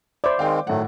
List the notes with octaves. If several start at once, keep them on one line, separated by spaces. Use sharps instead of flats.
C5 D5 E5 B5
D#3 G#3 C4 F5 G5 D6
A2 D#3 F#3 A3 F#5